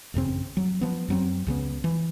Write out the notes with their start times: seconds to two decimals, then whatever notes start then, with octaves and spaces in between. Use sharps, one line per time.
0.14 A1 F#2 C#3 C4
0.57 F#3
0.81 F3 B3
1.08 F#2 F#3 C4
1.47 C#2 C#3 B3
1.84 E3